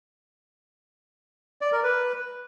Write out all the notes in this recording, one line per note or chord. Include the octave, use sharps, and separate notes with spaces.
D5
A#4
B4